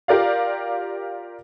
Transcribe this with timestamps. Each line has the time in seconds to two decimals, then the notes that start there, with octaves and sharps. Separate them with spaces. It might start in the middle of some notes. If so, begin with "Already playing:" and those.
0.08 F4 G4 A#4 D5 F5